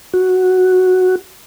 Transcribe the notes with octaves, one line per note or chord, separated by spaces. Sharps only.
F#4